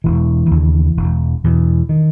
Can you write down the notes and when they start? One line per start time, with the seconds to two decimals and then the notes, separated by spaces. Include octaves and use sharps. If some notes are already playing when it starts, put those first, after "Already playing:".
0.04 E1 E3
0.51 D#2 C#3
0.97 E1
1.44 E2 B2
1.89 D#3